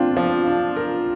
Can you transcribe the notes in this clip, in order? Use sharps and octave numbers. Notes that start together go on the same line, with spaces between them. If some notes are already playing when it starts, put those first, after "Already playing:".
Already playing: C4 D4 F4
F3
D4
A#4